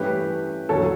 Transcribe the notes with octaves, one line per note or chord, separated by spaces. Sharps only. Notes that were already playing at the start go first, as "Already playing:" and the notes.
Already playing: G2 E3 A3 C#4 G4 B4
E2 D3 F#3 A4 C#5